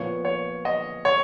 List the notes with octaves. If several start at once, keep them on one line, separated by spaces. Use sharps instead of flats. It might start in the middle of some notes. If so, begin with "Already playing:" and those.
Already playing: A#2 F3 B3 C#5
C#5
D#5
C#5